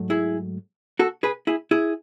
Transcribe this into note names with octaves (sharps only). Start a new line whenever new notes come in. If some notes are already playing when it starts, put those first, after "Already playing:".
Already playing: G#2 F#3 A3
E4 G#4
F#4 A4
G#4 B4
E4 G#4
E4 G#4